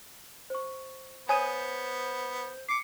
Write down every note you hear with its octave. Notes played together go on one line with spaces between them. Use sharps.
C5 C#6
B3 C5 C#5 G#5 D#6 D#7
D6 C7 C#7